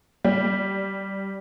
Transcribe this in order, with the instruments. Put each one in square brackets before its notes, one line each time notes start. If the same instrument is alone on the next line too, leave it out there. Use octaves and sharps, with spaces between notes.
[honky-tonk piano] G3